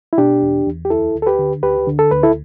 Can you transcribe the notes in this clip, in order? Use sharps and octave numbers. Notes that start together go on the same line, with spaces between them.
E4
B2 D4 G4
E2
E2
G4
D2 E4 A4
D2
A4
G4 B4
D3
D2 G4 B4
D3
A4
D2 B4
E4 A4